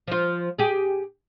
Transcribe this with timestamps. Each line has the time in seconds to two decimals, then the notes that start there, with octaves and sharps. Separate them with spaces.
0.08 F3 F4
0.59 G4 G#4